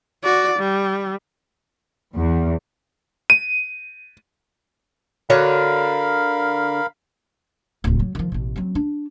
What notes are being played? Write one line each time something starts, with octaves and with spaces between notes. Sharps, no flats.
F#4 D5
G3
E2
D#7
D3 F#4 A#4 C#5 F5 B5
D1 C#2
F#3
D#3 F3
A1 B2
F#3 C4
D4